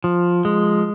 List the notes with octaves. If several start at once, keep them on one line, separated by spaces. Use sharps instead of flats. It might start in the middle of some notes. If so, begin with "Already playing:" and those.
F3
G#3